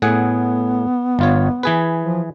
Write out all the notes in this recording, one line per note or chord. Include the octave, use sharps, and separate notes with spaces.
A2 B3 G#4 F#5
G1 F4 C#5
E3 G#4 B4
F3